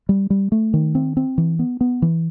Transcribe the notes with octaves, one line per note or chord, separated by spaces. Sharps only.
G3
G3
A3
D#3
C4
C4
E3
B3
B3
E3